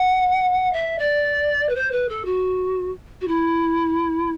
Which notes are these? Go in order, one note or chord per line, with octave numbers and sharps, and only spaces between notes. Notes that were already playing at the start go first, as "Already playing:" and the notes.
Already playing: F#5
E5
D5
B4
C5
B4
A4
F#4
F#4
E4